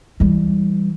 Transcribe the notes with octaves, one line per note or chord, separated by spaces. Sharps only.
E3 G3